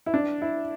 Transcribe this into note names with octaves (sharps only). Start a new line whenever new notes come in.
E4
D4
E4